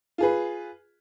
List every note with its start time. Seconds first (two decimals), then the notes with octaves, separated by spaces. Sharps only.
0.18 F4 G#4 B4